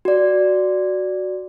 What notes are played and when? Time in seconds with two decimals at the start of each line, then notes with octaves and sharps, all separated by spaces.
0.05 F#4 D5